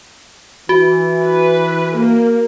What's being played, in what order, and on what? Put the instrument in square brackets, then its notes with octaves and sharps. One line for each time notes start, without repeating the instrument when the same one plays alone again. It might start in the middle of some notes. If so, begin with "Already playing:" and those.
[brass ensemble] E3 [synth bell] F#4
[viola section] B4
A#3